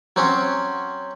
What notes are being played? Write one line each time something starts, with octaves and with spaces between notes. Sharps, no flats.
F#3 C4 C#4